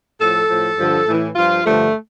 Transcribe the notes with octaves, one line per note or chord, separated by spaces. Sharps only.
A2 F3 A4
A2 F3
G2 D3 F3
A2 E3
G2 F3 F4
G2 D3 F3 A3